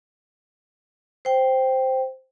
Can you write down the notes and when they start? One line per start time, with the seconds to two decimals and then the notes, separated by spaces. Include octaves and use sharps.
1.25 C5 G5